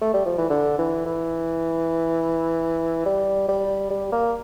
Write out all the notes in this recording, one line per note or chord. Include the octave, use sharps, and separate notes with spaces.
A3
G3
F3
E3
D3
E3
E3
G3
G3
G3
A#3